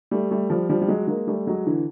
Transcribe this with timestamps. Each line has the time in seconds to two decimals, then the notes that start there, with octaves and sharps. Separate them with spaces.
0.11 G3 A3
0.31 G3 A3
0.50 F3 G3
0.69 F3 G3
0.81 G3
0.88 F#3 G#3
1.07 G#3 A#3
1.27 G3 A3
1.47 F#3 G#3
1.66 D3 E3